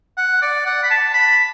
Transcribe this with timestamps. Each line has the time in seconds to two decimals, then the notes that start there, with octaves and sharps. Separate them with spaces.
0.17 F#5
0.42 D5
0.66 F#5
0.83 B5
0.91 A5
1.14 B5